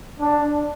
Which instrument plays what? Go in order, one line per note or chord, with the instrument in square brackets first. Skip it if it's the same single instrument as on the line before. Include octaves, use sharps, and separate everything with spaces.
[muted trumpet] D4